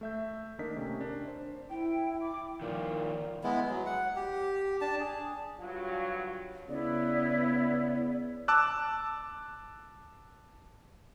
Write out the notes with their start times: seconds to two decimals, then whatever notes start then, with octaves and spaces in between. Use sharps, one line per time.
0.01 A3 E5 G6
0.59 D#3 A#3 D4 A#4 D#5 B6
0.76 C3 A3 C#4
1.00 D4 A#4
1.28 C5
1.70 E4 G5
2.21 D6
2.61 A#2 D#3 F3
3.44 G#3 B3 E4
3.70 F#3
3.86 F#5
4.16 G4
4.81 D4 A5
5.00 G#4
5.59 G2 F#3 F4
6.69 C#3 B3 E4 D5
8.48 A5 D6 E6 F#6